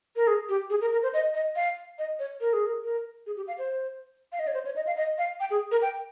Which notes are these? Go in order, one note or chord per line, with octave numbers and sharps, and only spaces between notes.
A#4
G#4
G4
G#4
A#4
A#4
C5
D#5
D#5
F5
D#5
C#5
A#4
G#4
A#4
A#4
G#4
G4
F5
C5
F5
D#5
C#5
C5
C#5
D#5
F5
D#5
F5
G5
G#4
A#4
G5